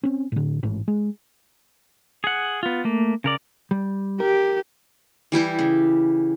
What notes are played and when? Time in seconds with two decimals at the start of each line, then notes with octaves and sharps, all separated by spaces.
0.03 C4 C#4
0.32 A2 D3
0.63 A1 G#2
0.88 G#3
2.24 G#4 F#5
2.63 B3 F4
2.84 A3 A#3
3.24 C#3 A#4 D5
3.71 G3
4.20 G4 A#4
5.32 E3 G3 E4 G4
5.59 C#3